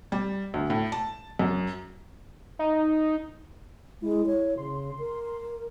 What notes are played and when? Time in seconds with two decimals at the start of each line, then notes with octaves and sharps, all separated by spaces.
0.12 G3
0.54 D2
0.70 A2
0.92 A5
1.39 F#2
2.59 D#4
4.02 G#3 E4
4.26 C#5
4.58 C#3 C6
4.98 A#4